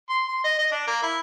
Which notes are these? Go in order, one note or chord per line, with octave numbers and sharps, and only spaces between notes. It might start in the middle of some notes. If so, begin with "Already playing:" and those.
C6
C6
D#5
D#5
D4
A#3
E4